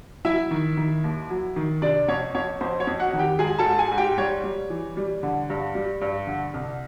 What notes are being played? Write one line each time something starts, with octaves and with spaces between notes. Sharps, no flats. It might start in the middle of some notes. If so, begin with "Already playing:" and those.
F#3 E4 E5
D#3
D#3
D#2
F#3
D#3
C3 D4 D5
F2 C#5
F2 C#5
F2 C5
C#5
F2
F#4 F#5
D#3
G4 G5
G#2 G#4 G#5
A4 A5
G#2
G#4 G#5
G#2
G4 G5
G3 C#5
G3
E3
G3
D3
G2
G3
G2
D3
C2